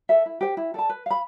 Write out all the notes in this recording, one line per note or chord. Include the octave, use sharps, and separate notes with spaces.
A4 E5
E4
G4 C5 G5
E4
A4 D5 A5
B4
F5 B5